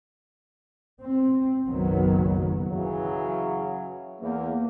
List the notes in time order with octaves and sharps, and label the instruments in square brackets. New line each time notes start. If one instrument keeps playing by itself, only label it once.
[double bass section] C4
F#1 B1 D#3 F#3 B3
[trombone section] C#3 E3 F#3
[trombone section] E2 [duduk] A#3